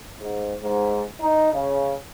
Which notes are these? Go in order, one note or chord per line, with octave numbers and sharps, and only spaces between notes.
G#2
G#2
D#4
C#3